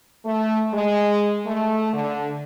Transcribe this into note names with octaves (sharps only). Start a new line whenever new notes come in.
A3
G#3
A3
D3